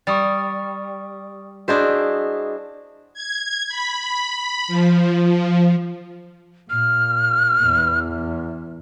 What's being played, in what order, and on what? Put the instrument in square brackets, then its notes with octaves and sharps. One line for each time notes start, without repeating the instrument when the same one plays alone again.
[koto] G3 [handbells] C#6 D#6 A6
[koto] D4 E4 C5 [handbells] F#4 G#4 D#5
[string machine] G#6
B5
F3
[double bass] A#2 [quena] F6
[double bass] E2